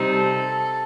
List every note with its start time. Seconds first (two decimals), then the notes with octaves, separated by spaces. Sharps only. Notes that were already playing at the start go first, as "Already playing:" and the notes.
Already playing: C3 G3 C4 D#4
0.13 A4